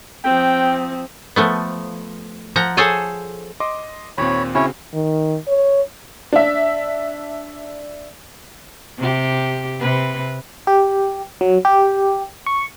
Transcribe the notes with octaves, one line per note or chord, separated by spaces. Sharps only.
F3 C4 G5
F3 A3 B3
F3 F#5 A#5
G#4 A4 C5 C#5 G#5
D#5 C6 D6
D#2 A#2 C4 C#5 B5
C#3 C4 C#4 E4 F#4 C#5
D#3
C#5
D4 E5
C3 G4
C3 B4
G4
F#3
G4
C#6